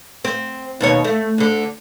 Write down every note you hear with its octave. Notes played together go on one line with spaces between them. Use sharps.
C4
D#2 B2 C#5
A3
D2 D3